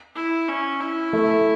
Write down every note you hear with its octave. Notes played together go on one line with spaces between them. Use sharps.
E4
C#4
E4
A3